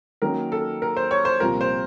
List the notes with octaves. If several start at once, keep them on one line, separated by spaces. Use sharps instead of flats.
D#3 F#3 A#3 C#4 A#4
A4
A#4
C5
C#5
C5
C2 A#2 F3 C4 F4 A#4
C5